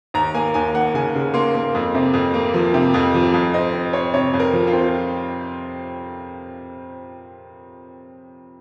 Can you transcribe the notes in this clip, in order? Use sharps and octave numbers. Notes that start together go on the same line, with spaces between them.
D#2 A#5
A#3 G#5
D#2 G#5
A#3 F#5
C#3 G#5
C#3
A#3 C6
A#3
F2
C3
F2
A#3
F3
C3
F2
F3
F2
C4 D#5
C4
C4 C#5
C3 C#5
F2
A#4
F3
F4
C4